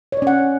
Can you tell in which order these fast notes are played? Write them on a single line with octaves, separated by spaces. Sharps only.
C#5 D5 C#4 F#5